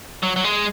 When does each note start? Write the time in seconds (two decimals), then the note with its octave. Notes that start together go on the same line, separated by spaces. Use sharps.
0.23 F#3
0.36 F#3
0.44 G#3